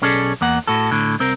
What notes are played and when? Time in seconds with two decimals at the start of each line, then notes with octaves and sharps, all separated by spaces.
0.02 B1 C#4 G#4 A4 D5
0.41 E2 A#3 F#5
0.67 A2 F#4 A4
0.91 A2 D3
1.20 C2 C4 A#4